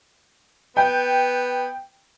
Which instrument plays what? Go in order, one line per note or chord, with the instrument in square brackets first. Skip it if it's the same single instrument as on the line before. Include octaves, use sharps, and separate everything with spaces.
[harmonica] B3 [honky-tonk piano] G5